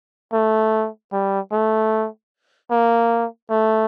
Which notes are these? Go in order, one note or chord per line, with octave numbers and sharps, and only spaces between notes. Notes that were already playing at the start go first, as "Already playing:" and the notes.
A3
G3
A3
A#3
A3